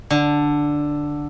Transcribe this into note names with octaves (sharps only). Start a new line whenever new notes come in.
D3